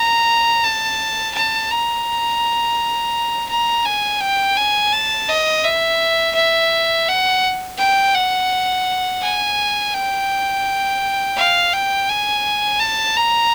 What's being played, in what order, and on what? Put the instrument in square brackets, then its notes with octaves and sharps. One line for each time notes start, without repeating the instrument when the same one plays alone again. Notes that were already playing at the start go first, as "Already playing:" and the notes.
Already playing: [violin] A#5
A5
A5
A#5
A#5
G#5
G5
G#5
A5
D#5
E5
E5
F#5
G5
F#5
G#5
G5
F5
G5
G#5
A5
A#5